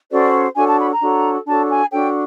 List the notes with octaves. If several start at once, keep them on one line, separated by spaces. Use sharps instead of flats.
C#4 F#4 A4 C5 D5
D4 F#4 A4 C#5 G#5
A5
B5
A#5
D4 F#4 A4 C#5
D4 F#4 A4 C#5 A5
G#5
D4 F#4 A4 C#5 G5